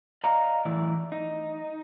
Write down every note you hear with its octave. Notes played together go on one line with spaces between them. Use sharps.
D5 D#5 F5 A#5
F#2 A2 E3 E4 D5
D#4